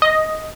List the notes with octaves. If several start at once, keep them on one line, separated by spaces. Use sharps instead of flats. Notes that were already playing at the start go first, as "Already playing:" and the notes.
D#5